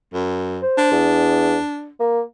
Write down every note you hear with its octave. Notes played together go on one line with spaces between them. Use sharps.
F#2
C5
D4
E2
A#3